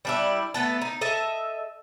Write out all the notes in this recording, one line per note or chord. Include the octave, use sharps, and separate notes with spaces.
G3 D4 E4
A3 B3 A4
D#4
A4 D#5 E5